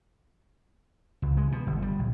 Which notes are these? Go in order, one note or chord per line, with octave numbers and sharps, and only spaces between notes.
C#2
G#3
B2
G1
G3
A#1